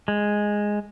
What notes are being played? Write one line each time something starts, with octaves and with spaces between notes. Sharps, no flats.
G#3